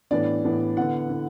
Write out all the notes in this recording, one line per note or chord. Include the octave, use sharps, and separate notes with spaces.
A2 E3 B3 D4 D5
A2 E3 B3 D4
D3 B3 E4 F#5
D3 B3 E4